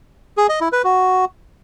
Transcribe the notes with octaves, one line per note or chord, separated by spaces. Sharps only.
G#4
D#5
E4
B4
F#4